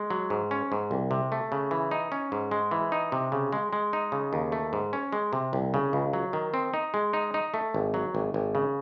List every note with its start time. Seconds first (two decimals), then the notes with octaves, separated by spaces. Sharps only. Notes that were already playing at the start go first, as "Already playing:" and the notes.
Already playing: G#3
0.10 F#3
0.30 G#2
0.51 C#4
0.72 G#2
0.91 C2
1.11 C3
1.32 A3
1.52 C#3
1.71 E3
1.91 D#4
2.12 C#4
2.32 G#2
2.51 G#3
2.71 E3
2.92 D#4
3.12 C3
3.32 C#3
3.53 G#3
3.73 G#3
3.93 D#4
4.12 C#3
4.33 D#2
4.52 A3
4.73 G#2
4.93 C#4
5.13 G#3
5.33 C3
5.53 C2
5.74 C#3
5.93 C#2
6.13 F#3
6.33 D#3
6.54 C4
6.74 D#4
6.94 G#3
7.13 D#4
7.34 D#4
7.54 A3
7.74 G#1
7.94 F#3
8.15 G#1
8.34 G#1
8.55 C#3